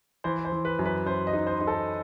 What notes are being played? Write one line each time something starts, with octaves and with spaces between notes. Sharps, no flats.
E3 C5
C5
E3
B4
F#2
B4
F#2 C5
D#5
D#4
C5
D#4
A4